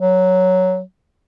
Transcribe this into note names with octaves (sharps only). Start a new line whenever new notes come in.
F#3